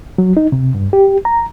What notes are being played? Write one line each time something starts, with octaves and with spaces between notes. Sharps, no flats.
F#3
D#4
C3
G2
G4
A#5